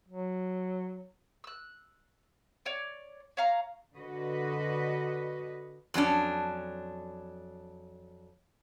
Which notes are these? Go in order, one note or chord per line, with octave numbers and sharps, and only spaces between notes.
F#3
E6 F#6
C#5 D5
C#5 F5 A#5
D3 F#4 B4 D#5
F2 F#3 C#4 D4